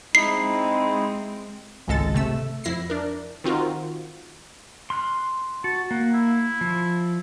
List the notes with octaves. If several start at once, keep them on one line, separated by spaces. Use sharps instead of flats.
G#3 C4 D#4 E4 C7
G#1 C#2 G#3 A4 A6
C3 A3 E6
F2 E4 A#6 C7
D4 A#4
D#3 C4 F4 F#4 A#4
C6 F6 F#6
F#4 A5
A#3 F#5
E4
F3